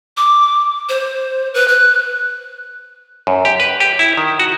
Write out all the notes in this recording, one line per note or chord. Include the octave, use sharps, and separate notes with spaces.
D6
C5
B4
F#6
F#2
G4
B4
G4
E4
D#3
F#4